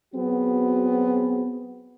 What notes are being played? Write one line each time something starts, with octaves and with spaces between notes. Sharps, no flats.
F#3 B3 C4 F#4 G#4